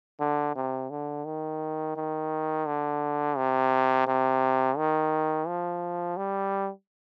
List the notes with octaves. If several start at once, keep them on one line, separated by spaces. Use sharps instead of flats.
D3
C3
D3
D#3
D#3
D3
C3
C3
D#3
F3
G3